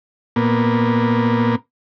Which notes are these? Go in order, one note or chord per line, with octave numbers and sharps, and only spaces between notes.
A#2 A#3 B3